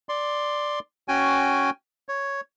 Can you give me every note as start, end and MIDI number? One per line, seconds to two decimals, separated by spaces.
0.09 0.79 74
0.09 0.79 84
1.08 1.70 61
1.08 1.70 66
1.08 1.70 79
1.08 1.70 80
2.09 2.41 73